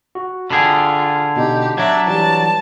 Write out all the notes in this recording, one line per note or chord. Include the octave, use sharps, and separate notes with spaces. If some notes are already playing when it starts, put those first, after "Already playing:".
F#4
D3 F4 G#4 G5 A5 B5
B2 D#4 G4
F#3 D4 E5 G#6
E3 G3 A5